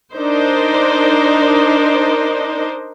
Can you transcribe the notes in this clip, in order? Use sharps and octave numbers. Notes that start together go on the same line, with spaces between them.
D4 D#4 A#4 C5